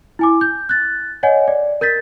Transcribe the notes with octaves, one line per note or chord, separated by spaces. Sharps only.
E4 G#5 D6
G6
F#6 A6
C#5 D#5 F#5 G#5
D5
A#4 G6 A6 B6